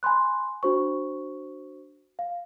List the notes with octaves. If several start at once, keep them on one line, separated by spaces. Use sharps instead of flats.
G#5 B5 C6 F#6
D4 F#4 C5 C#6
F5